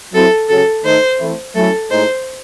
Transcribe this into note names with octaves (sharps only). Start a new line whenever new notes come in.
F#3 C4 E4 A4
C#3 F#3 C#4 A4
D#3 A3 D#4 C5
E3 A3 C4 E4
F#3 A3 C#4 E4 A4
A2 G#3 D#4 C5